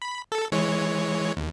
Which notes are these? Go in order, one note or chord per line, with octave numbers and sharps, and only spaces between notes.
B5
A4
E3 G#3 C#5
D#2